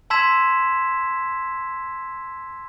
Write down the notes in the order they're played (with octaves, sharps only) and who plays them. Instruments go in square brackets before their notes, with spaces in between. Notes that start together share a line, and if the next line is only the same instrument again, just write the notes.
[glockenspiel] A5 C6 E6 G#6 B6 E7